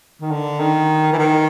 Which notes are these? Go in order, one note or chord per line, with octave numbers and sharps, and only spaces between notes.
D#3
D3
D#3
E3
D#3